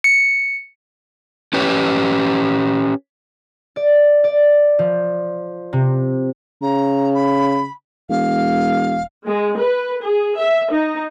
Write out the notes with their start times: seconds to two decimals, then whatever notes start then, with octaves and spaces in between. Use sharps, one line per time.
0.04 C#7
1.53 C#4 G4 B4 C#5
3.76 D5
4.24 D5
4.79 F3
5.73 C3
6.62 C#3 A#5
7.14 B5
8.09 E1 F5
9.25 G#3
9.57 B4
10.04 G#4
10.38 E5
10.71 D#4